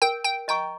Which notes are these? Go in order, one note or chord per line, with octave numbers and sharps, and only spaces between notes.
A#4 G5
G5
D#5 G5 A#5 C#6